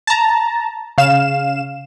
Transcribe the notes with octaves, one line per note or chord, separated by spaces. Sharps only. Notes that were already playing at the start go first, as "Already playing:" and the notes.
A5 A#5
C#3 F5 E7